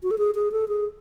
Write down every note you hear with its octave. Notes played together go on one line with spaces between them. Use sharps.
F#4
A4
G#4
G#4
A4
G#4